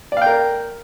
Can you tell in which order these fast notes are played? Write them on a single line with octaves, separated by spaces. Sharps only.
D5 F5 G5 A#4